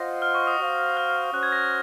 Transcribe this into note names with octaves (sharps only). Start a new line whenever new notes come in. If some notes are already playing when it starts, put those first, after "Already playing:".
Already playing: F4 C5 D#5 F#5 A#6
F6
C#6
D#6
F#4 C5 F5
F6
C#4 F#4 C5 F#6
G#6
A#6